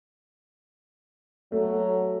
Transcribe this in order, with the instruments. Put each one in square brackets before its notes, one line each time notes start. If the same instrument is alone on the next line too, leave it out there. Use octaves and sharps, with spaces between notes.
[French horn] F#3 [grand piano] A3